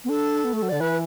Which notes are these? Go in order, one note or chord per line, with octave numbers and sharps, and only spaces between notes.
B3
D4 A4
B3
A3
F#3
D3 D5
E3 B4